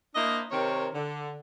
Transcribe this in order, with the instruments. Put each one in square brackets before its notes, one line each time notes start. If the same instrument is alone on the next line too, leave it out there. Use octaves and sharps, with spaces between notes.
[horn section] A#3 D4 E4 C5 D#5
C3 D#3 C4 A#4 C#5
D3